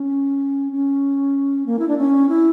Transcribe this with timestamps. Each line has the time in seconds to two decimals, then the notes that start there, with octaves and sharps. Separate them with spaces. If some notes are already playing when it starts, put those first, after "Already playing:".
Already playing: C#4
0.72 C#4
1.66 A#3
1.79 E4
1.88 D4
1.98 C#4
2.29 E4